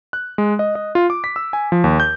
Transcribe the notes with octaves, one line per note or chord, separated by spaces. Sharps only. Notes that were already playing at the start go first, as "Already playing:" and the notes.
F#6
G#3
D#5
D#5
F4
D6
B6
E6
G#5
F3
D#2
G6